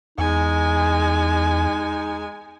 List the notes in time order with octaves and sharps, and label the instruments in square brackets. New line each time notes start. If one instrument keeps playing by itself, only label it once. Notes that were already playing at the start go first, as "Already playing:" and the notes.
[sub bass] E2 [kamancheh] G#3 G#5 [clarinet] D#4